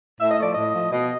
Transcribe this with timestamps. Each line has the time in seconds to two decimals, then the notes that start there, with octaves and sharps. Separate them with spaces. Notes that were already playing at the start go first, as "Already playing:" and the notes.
0.20 A2 E5
0.31 D#5
0.38 F3 A3 D5
0.53 A2 D#5
0.74 F3 A3
0.91 B2 D#5